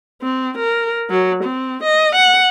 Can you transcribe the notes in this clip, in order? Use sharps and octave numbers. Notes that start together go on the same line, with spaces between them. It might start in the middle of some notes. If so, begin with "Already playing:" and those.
C4
A#4
F#3
C4
D#5
F#5